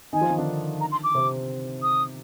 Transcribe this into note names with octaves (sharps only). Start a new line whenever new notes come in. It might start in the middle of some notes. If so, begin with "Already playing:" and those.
D#3 D#4 G#5
F3 F4
D#3 D#4
D3 D4
A#5
C6
D6
C3 C4
D#6